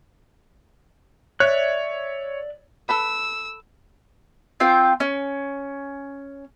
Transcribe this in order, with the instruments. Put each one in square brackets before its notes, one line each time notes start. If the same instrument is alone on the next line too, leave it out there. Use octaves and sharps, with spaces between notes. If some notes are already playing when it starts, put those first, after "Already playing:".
[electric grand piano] C#5 [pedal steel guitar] D5 E5 F#6
[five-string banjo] A4 B4 B5 [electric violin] E6
[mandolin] C4 F4 G5
C#4